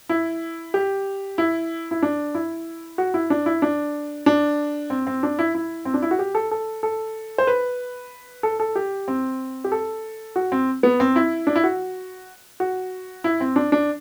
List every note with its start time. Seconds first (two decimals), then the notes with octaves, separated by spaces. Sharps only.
0.09 E4
0.74 G4
1.38 E4
1.91 E4
2.02 D4
2.35 E4
2.98 F#4
3.14 E4
3.30 D4
3.46 E4
3.62 D4
4.26 D4
4.90 C4
5.07 C4
5.23 D4
5.39 E4
5.55 E4
5.85 C4
5.94 D4
6.02 E4
6.11 F#4
6.19 G4
6.35 A4
6.51 A4
6.83 A4
7.38 C5
7.47 B4
8.43 A4
8.60 A4
8.76 G4
9.08 C4
9.64 G4
9.72 A4
10.36 F#4
10.52 C4
10.83 B3
11.00 C4
11.16 E4
11.47 D4
11.56 E4
11.64 F#4
12.60 F#4
13.24 E4
13.41 C4
13.56 D4
13.72 D4